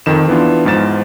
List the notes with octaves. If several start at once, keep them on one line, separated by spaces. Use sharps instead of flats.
F2 D#3 E7
E3 B3 D4 F4
E2 G#2 F3 A6 E7